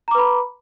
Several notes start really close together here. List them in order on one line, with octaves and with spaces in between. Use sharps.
A#5 D6 B4 B5